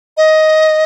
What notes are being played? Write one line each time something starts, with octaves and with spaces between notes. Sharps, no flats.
D#5